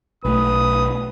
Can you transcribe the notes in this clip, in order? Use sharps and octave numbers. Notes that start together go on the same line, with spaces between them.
B1 A3 B4 D#6